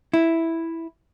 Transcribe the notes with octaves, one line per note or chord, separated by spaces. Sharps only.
E4